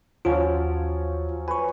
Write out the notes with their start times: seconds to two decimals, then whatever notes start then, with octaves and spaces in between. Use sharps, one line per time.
0.25 D#2 F3 F#3 C#4 F4
1.48 B4 G#5 C#6